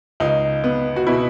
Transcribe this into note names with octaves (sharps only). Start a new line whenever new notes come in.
C#2 D#4
B3
F#4
B2 E4